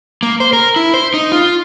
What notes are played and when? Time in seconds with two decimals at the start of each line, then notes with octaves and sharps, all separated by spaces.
0.23 A#3
0.40 C5
0.53 A#4
0.76 E4
0.94 C5
1.14 D#4
1.32 F4